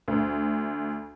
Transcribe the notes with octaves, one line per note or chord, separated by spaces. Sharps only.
D2